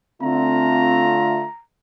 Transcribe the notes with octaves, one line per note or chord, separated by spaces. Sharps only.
D3 A3 C4 F4 A#5